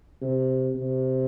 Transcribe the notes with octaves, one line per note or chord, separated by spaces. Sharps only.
C3
C3